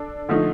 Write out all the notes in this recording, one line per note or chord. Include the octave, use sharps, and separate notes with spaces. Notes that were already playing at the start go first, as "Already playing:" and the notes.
Already playing: D4 A4
D3 F3 A3 D#4